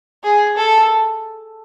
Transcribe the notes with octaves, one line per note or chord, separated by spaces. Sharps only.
G#4
A4